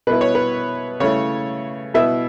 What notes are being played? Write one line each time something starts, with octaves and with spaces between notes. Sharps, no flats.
B2 B3 E4 B4
C#5
B4
C#3 A3 E4 C#5
B2 B3 E4 E5